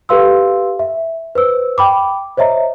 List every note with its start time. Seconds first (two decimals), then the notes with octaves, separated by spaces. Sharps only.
0.09 G4 A4 B4 F5 C6 E6
0.79 E5
1.35 B4 C5 E6
1.78 G5 B5 D6
2.37 C5 C#5 D#5 E5 A#5